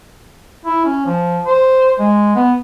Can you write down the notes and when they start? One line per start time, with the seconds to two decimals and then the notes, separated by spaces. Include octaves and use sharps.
0.65 E4
0.85 C#4
1.06 F3
1.45 C5
1.99 G#3
2.36 B3